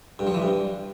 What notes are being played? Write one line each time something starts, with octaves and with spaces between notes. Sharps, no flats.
G2
F3
E3
G2